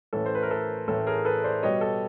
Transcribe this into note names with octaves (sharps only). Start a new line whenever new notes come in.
A2 E3 A3 C#4 A4
C5
B4
A#4
A4
A2 E3 A3 C#4 A4
G#4 A#4
A4 B4
C5 D5
B2 G3 B3 C#5 D#5
A4